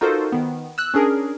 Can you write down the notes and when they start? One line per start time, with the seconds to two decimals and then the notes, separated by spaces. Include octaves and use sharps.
0.01 D#4 F4 F#4 A4 A#4 C5
0.32 D#3 B3
0.78 E6 F#6
0.94 C#4 D4 G#4 A#4